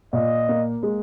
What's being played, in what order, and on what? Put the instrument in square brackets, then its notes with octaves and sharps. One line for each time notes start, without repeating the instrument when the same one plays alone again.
[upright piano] A#2 [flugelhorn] D#5
[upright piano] A#3
G#3